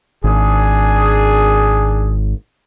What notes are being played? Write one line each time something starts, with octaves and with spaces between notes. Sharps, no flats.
G#1 D4 G#4